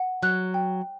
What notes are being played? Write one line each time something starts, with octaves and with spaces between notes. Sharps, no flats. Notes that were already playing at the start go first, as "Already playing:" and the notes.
Already playing: F#5
F#3 F#6
G5